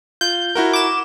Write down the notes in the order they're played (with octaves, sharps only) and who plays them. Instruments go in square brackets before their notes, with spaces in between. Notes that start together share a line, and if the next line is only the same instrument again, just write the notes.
[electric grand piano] F4 [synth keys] G6
[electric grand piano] E4 F#4 A#4
[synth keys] D6 E7